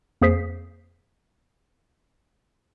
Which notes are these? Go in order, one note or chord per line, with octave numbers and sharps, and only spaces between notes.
F2 A#3 G#4 C5 B6 C7